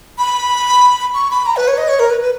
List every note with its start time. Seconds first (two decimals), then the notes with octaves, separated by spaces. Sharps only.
0.19 B5
1.14 C#6
1.31 B5
1.46 A#5
1.56 B4
1.68 C#5
1.78 D#5
1.88 C#5
1.99 A#4
2.10 B4
2.21 B4